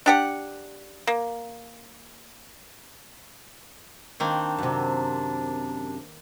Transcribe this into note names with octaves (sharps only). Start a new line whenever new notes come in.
D4 G4 F#5
A#3
D#3 A#3 C4 D4
F#2 C3